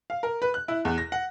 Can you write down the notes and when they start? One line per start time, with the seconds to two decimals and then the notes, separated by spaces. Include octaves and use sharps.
0.10 F5
0.23 A#4
0.42 B4
0.54 F#6
0.68 E4
0.85 E2
0.98 A#6
1.12 F#5